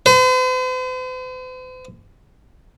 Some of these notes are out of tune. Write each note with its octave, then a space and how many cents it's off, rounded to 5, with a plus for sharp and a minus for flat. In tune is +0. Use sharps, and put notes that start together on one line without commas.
C5 -45